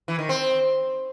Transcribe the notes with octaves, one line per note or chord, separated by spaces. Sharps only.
E3
D#3
C4